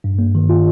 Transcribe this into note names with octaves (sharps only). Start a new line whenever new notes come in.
G2
A#3
D#3
F4